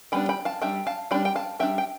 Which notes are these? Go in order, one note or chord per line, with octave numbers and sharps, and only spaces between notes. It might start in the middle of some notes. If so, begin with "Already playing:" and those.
G3 B3 D4 G5 B5
G5 B5
F5 A5
G3 D4 E5 G5
F5 A5
G3 D4 G5 B5
G5
F5 A5
G3 D4 E5 G5
G5